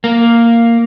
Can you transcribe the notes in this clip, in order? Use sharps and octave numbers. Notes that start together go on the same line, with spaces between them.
A#3